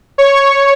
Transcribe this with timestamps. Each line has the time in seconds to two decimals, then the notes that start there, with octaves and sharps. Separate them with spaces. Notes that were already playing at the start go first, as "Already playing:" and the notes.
0.18 C#5 C#6